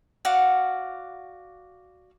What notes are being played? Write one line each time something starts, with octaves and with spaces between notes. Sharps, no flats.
F#4 D5 F5 F#5